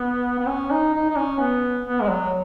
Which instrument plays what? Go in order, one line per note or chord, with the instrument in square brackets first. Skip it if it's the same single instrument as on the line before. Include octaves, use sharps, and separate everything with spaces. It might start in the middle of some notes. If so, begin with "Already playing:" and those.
Already playing: [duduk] B3
B3
C#4
D#4
D#4
D#4
C#4
B3
B3
G#3
F#3